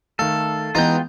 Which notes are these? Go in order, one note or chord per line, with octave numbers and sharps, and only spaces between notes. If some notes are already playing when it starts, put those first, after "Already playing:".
D#3 A3 A4 F5
E3 G#3 B3 D#4 F4 G5 A#5